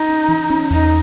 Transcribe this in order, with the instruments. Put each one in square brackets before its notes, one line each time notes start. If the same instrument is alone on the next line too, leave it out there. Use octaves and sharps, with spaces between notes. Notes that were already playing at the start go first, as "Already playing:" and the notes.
Already playing: [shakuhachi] D#4
[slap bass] C#4
E3
C#4
[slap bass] E2 [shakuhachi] D#4